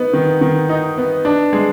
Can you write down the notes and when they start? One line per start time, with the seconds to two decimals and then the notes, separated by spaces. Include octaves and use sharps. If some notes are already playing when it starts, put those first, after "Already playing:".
Already playing: B3 D#4
0.13 D#3
0.41 D#3
0.69 D#4
0.97 B3
1.25 D4
1.53 G#3